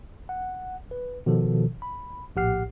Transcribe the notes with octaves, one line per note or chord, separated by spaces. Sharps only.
F#5
B4
B2 D#3 F3 A4
B5
A#1 A2 G4 F#5 F6 C7